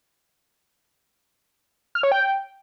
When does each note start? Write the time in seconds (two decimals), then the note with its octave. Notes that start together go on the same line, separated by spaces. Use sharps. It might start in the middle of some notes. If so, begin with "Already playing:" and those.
1.95 F6
2.03 C#5
2.12 G5